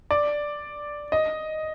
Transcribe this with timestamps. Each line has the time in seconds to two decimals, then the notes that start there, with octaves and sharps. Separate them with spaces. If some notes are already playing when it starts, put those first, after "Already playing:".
0.11 D5
1.12 D#5